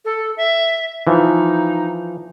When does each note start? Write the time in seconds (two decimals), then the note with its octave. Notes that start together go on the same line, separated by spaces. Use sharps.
0.05 A4
0.37 E5
1.07 E3 F3 D#4